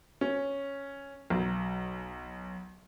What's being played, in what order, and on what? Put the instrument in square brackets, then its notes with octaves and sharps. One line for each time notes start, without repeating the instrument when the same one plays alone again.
[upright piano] C#4
B1